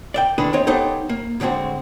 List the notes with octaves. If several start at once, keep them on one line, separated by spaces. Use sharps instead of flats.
D5 E5 G5
D3 D#3 D4 E4 G#4 B4
C4 D#4 C#5 D#5
B3 C#4 D#4 G4 A4 C5
A#3
A2 D3 G#3 C4 F#4